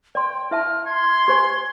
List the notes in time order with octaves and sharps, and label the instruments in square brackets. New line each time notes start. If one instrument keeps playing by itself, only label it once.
[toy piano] D5 C6 [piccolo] G5
[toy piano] E4 E5 A5 [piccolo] F6
[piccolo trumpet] C6 [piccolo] G#6
[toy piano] G4 C5 G#5